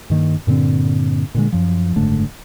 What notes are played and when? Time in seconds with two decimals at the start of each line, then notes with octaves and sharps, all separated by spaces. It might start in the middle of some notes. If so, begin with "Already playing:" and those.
0.10 G2 D#3 A#3
0.47 G2 A#2 D3 C4
1.34 A#2 D3 G#3
1.52 F#2 F3
1.96 F#1 G#2 D3 A3